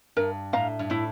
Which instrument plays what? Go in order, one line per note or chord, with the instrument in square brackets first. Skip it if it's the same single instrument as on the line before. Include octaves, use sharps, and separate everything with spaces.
[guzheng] G2 [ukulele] A#4
[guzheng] A2 [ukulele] F5 A#5
[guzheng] G2
[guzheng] A2 [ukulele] E4